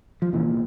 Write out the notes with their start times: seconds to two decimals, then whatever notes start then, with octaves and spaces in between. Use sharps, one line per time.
0.22 F3
0.33 C2 A#2 E3